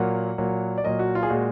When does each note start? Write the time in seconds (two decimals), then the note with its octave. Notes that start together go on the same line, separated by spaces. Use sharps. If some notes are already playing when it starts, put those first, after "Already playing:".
Already playing: A#2 F#3 A#3 F#5
0.38 A#2 F#3 A#3
0.78 D5
0.84 A#2 F#3 A#3 D#5
0.99 F#4
1.15 F4
1.23 G#4
1.30 A#2 G#3 F#4